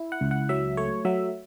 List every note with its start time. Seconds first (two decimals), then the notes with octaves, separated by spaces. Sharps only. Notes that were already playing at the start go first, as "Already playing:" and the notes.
Already playing: E4
0.12 F#5
0.21 C#2
0.31 F#5
0.49 F#3 E5
0.77 A3 C#5
1.05 F#3 E5